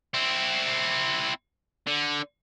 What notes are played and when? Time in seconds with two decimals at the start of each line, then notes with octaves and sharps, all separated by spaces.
0.14 C4 E4
1.87 D3